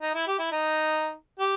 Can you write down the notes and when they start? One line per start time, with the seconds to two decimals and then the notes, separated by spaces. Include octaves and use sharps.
0.02 D#4
0.14 E4
0.27 G4
0.39 E4
0.52 D#4
1.39 G4